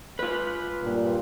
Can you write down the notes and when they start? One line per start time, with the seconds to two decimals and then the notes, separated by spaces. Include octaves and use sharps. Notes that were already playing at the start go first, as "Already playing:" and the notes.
0.19 F4 B4
0.82 G2 A#2